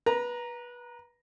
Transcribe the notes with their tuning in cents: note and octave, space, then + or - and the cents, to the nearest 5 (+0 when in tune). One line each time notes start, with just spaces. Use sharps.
B4 -25 A#5 +5